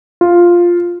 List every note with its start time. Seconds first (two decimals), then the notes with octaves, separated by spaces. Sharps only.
0.21 F4